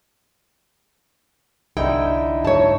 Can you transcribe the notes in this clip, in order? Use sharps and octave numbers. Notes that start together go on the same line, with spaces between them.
C2 D3 D#4 E4 G5
G#2 C#5 A5